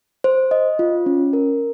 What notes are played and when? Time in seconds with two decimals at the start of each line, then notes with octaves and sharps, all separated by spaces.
0.24 C5
0.51 D#5
0.79 F4
1.06 C#4
1.33 A#4